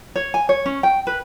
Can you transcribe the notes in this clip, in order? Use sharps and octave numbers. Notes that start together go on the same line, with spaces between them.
C#5
G#5
C#5
C#4
G5
B4